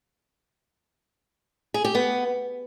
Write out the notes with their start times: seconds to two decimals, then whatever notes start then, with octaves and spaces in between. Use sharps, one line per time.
1.74 G#4
1.84 G4
1.95 B3